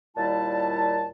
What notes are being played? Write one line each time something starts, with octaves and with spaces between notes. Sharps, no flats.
D#2 A#2 G3 E4 A5